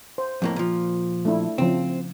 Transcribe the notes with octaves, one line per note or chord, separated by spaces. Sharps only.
C5
F2 A2 A#3
A#2 F3
A3 D4 E4
C#3 F3 C4